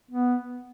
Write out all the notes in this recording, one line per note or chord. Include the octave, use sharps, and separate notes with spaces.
B3